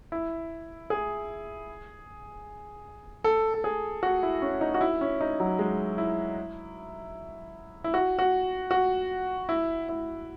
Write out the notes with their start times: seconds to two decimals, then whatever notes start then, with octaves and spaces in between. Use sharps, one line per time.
0.12 E4
0.90 G#4
3.24 A4
3.54 A4
3.64 G#4
4.03 F#4
4.23 E4
4.42 C#4
4.61 D#4
4.74 F#4
4.81 E4
5.01 C#4
5.21 D#4
5.40 F#3
5.59 G#3
5.98 E4
7.84 E4
7.94 F#4
8.19 F#4
8.71 F#4
9.49 E4
9.89 E4